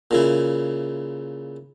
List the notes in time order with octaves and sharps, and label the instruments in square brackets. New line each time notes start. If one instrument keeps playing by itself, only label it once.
[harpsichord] A#2 C#3 E4